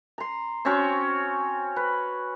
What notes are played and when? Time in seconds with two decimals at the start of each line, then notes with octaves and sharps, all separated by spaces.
0.18 A#5 C6
0.65 C4 C#4 F#4 C#5
1.76 B4